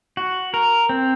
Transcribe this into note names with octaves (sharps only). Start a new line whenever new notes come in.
F#4
A#4
C4